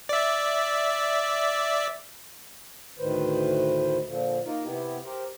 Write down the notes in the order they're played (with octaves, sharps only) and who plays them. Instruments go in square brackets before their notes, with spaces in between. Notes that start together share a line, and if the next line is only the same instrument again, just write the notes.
[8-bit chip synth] D5 E5
[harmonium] D2 A2 D#3 B4 C5
A#2 D3 F3
A#3 D#4 F4 A#4
C3 B3 E4 G4
G4 A#4 C5